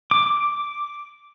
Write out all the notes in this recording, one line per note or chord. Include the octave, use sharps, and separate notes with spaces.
D6